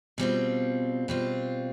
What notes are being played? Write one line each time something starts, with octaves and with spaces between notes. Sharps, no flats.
B2 G3 C4 F4
B2 G3 C4 F4